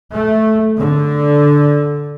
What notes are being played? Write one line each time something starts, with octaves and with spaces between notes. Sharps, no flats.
A3
D3